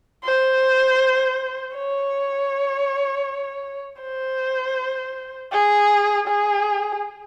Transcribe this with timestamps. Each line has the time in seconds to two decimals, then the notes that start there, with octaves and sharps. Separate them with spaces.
0.24 C5
1.75 C#5
4.01 C5
5.52 G#4
6.28 G#4